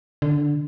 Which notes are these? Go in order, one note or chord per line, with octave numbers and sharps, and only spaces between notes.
D3